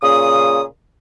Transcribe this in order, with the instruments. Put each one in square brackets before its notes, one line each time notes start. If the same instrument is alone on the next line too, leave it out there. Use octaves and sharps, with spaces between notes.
[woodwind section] A#2 C#3 D#6